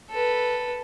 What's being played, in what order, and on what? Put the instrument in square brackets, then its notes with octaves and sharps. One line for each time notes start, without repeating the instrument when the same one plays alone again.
[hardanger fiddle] A4 B4